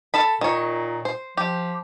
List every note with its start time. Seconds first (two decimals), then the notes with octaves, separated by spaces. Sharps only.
0.14 A4 A5 B5
0.41 A#2 D#3 C#5
1.05 C5
1.37 F3 G4